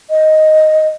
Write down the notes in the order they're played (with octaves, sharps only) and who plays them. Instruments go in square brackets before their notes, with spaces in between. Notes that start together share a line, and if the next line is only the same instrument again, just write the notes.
[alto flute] D#5